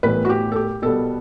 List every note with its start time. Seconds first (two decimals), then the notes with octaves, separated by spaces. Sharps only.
0.03 A2 E3 G3 B3 B4
0.25 F#4
0.29 G4
0.52 A4
0.56 G4
0.82 B2 G3 B3 A4